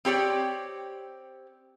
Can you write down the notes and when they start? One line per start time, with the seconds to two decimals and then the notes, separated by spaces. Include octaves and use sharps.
0.05 C4 G4 C#5 D5